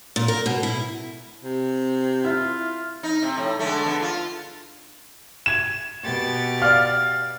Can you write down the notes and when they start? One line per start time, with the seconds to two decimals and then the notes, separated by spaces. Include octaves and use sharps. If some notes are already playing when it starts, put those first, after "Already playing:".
0.16 A#2
0.28 A#4
0.46 B2
0.63 E4
1.43 C3
2.25 E4 F4
3.03 D#4
3.22 C3
3.37 A2
3.59 D3 G#3 A3
3.85 D3 B3
4.02 F4
5.46 G#6 E7
6.04 B2 G4 A6
6.62 D5 F5 F6